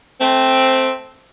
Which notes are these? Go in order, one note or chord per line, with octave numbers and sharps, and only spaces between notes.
A3 C4